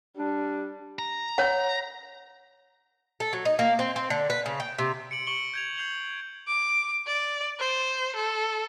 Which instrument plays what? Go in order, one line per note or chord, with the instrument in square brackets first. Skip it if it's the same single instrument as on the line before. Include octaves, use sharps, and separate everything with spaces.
[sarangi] G3 [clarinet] D4
[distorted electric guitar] A#5
[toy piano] C#5 F#5
[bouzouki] A4
F#3
D#4
A#3
C4
C4
D3
B4
C#3
G5
C3
[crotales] C#7 D7 F#7
C#6 C#7 D7 F#7 G7
G6 G#6 F7
G6 C7 F7 G7
[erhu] D6
D5
C5
A4